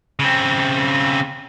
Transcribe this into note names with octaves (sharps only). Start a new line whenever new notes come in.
C#3 C4